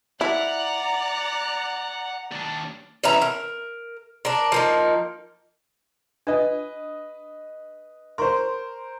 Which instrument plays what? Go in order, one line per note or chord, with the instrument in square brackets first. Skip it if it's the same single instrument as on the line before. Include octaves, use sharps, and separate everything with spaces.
[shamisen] E4 [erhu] D5 [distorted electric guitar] F#5 [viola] A#5
[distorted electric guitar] D#2 D4
[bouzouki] E3 C#4 E5 A#5
A#4
D4 A#4
F3 A#3 D#4
[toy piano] D4 [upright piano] B4 D#5
[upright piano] A#4 C5 [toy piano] C6 C#6